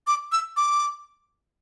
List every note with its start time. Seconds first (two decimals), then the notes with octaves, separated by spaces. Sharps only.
0.07 D6
0.32 E6
0.57 D6